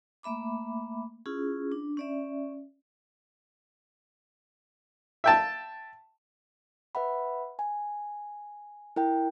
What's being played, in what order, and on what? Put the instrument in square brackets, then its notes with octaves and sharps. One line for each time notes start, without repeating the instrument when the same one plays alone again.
[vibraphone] A3 A#3 E5 B5 D6
C#4 E4 F4 G#4
D4
C#4 D5 E5
[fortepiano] E5 G5 A5
[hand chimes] B4 E5 F#5 B5
G#5
E4 A#4 G5